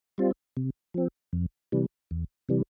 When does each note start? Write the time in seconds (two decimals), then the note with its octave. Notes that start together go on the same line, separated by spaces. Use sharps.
0.18 G3 C4 F4
0.57 C3
0.94 F3 C4
1.33 F2
1.72 C3 E3 G3
2.11 E2
2.49 C3 E3 G3